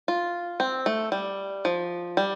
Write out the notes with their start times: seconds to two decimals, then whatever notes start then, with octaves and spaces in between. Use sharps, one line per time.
0.08 F4
0.60 C4
0.86 A3
1.12 G3
1.65 F3
2.17 G3